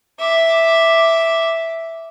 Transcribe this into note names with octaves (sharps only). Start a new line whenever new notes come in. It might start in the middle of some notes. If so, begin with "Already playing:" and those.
E5 D6